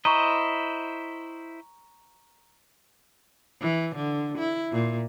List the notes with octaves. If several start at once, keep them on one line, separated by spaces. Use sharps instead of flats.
E4 C5 D#5 A#5 C#6
E3
D3
E4
A#2